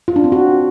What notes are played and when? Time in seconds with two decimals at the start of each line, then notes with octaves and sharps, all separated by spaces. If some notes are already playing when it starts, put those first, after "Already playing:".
0.08 F4
0.16 D4
0.24 C4
0.32 F#4